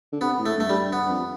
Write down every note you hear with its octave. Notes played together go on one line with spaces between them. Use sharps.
D3
C3 B3
A2
A3
G2 A3
G3
G2
G2 B3
F2